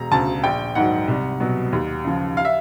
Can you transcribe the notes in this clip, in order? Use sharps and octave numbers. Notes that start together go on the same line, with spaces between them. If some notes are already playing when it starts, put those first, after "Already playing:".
Already playing: E1 A#5
D2 C#3 A5
A#1 G5
G#2 D#3 F#3 F#5
C2
B2 F#3
D#2
C#3 F3
F5
E5